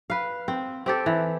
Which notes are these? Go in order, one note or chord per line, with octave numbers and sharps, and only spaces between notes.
B4 F5
C4
C4 G4 A4
E3